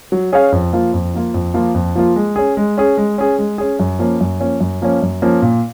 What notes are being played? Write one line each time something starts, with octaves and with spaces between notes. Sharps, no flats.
F#3
C#4 G#4 C#5 F5
F2
F3 A#3 F4
F2
F3 A#3 F4
F2
F3 A#3 F4
F2
F3 A#3 F4
G#3
C#4 G#4
G#3
C#4 G#4
G#3
C#4 G#4
G#3
C#4 G#4
F#2
F3 A#3 C#4
F#2
F3 A#3 C#4
F#2
F3 A#3 C#4
F#2
F3 A#3 C#4
A#2